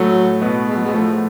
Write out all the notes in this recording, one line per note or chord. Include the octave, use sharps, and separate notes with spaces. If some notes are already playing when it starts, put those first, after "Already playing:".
Already playing: A2 F#3 A3
B2 B3
G#3
F#3
G#3 B3
A2 F3 A3